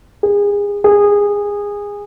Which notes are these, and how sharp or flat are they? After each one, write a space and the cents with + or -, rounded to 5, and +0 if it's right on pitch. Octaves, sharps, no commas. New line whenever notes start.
G#4 -30
G#4 -20